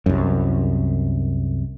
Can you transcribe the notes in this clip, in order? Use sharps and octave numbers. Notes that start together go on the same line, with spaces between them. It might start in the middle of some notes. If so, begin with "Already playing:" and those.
C2 F#2